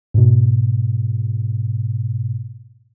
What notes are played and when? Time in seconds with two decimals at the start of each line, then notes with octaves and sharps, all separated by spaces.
0.14 G#2 B2